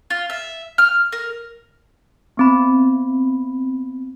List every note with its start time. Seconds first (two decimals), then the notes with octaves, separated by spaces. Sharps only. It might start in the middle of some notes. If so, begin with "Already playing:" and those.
0.10 F4
0.30 E5
0.78 F6
1.12 A#4
2.37 B3 C4 B5